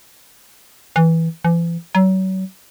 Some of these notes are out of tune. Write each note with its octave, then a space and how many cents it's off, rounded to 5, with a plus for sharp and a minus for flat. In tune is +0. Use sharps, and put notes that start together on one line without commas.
E3 -10
E3 +40
F#3 +35